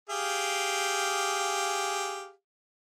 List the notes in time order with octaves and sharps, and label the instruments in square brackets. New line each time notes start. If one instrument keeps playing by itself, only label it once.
[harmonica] G4 G#4 F5